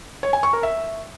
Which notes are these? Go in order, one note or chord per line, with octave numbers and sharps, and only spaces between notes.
C#5
G#5
C#6
A#4
E5